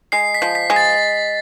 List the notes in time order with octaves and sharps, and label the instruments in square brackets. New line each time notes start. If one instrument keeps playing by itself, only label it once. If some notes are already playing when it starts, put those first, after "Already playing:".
[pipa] G#3 [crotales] C7
[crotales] B6
[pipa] F3
[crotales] B6
[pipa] G#3
[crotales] A6